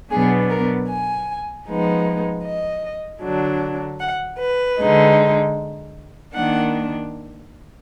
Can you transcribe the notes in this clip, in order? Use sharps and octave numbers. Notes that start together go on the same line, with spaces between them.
B2 F#3 B3 D4 G#4
A#4
G#5
F3 G#3 B3 D#4
D#5
D3 F#3 D4
F#5
B4
D3 G#3 D#4
D#3 A#3 D4 F#5